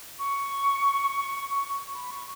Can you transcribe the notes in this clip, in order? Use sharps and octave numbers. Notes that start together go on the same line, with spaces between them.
C#6
B5
C#6